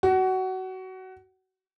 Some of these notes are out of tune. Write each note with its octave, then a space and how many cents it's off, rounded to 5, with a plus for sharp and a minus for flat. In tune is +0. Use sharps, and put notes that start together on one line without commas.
F#4 +20